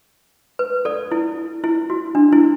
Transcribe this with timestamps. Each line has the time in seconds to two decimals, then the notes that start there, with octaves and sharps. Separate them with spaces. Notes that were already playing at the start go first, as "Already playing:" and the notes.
0.59 B4
0.85 A4 D5
1.11 E4
1.64 E4
1.90 F#4
2.15 D4
2.32 E4